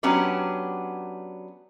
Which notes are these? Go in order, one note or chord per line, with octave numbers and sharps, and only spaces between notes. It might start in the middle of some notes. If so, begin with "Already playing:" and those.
F#3 B3 C#4 D4 G4 D5